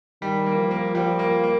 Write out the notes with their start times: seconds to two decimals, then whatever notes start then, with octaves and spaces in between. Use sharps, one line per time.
0.22 D#3 G3
0.46 A#3
0.58 F3
0.71 A#3
0.95 F3 G3
1.19 A#3
1.44 A#3